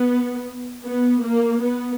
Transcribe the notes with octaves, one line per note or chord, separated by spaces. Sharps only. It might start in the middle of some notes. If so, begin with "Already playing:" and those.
Already playing: B3
B3
A#3
B3